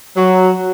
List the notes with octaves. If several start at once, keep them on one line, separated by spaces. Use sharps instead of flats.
F#3